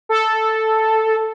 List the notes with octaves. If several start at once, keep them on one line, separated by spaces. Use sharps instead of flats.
A4